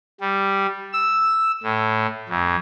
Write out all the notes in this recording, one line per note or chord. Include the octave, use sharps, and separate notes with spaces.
G3
E6
A2
F2